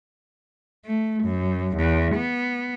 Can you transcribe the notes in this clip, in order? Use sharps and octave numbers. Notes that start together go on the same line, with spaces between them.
A3
F#2
E2
B3